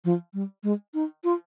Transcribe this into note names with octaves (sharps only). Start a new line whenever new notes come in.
F3
G3
G#3
D#4
F4